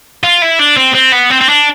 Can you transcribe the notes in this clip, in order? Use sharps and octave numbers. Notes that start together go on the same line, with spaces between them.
F4
E4
D4
C4
C4
B3
C4
C4
D4